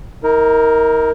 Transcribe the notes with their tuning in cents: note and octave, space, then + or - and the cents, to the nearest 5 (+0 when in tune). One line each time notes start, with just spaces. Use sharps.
D#4 +40 A#4 +0